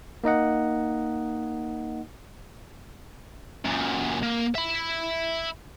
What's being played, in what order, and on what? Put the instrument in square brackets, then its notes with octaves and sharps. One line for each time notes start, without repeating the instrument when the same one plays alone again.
[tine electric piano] A#3 D#4 D#5 F#5
[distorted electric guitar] F#2 A#2
A#3
E5 B5